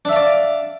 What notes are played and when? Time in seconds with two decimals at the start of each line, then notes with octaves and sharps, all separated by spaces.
0.05 D4
0.09 E5
0.12 F5
0.16 D5